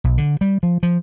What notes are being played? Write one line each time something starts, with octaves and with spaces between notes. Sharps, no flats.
B1
D3
G3
F3
F3